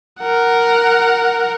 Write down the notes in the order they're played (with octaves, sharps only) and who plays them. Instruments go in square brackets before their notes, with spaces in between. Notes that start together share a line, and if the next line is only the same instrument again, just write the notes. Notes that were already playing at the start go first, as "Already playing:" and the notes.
[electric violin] A#4 F#5